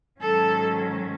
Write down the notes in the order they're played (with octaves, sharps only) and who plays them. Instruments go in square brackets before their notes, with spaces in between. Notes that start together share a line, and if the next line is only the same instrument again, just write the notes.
[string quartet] G#2 D#3 F#3 C#4 A4